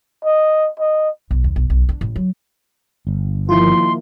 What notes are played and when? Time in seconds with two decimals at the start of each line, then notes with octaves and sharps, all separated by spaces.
0.25 D#5
0.80 D#5
1.31 B1
1.44 D#2
1.56 B1
1.70 B1
1.89 D4
2.01 A1
2.16 F#3
3.07 G1
3.49 D#3 F3 A#3 E4 F4 C6